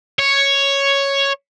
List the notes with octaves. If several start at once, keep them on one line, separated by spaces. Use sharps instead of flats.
C#5